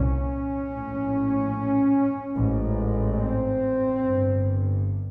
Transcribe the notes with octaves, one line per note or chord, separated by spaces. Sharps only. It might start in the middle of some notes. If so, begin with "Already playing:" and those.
Already playing: C2 A#2 C#4
A#1 A2
A1 G#2
C4
G1 G2